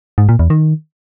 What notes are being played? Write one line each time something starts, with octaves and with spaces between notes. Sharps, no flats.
G#2
A#2
E2
D#3